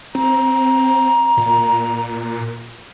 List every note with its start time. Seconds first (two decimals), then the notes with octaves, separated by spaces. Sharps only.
0.15 C4 A#5
1.37 A#2